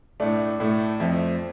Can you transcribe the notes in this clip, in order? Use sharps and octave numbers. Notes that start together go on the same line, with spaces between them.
A2 A3 D4
A2 A3
F2 F3 A3